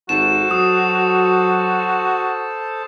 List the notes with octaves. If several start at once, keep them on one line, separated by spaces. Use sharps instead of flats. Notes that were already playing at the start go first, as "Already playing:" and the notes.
G#1 F#4 A4 C5 A5 E7
F#3 D#6